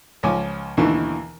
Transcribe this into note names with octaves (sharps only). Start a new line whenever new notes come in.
C#2 F3 C#5 G#5 D6
D#2 G#2 B2 D3 E3